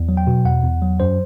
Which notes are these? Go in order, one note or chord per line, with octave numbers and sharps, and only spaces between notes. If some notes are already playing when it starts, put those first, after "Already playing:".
Already playing: E2
F#3
G5
B2
E2 F#5
E2
F#3
F#2 C5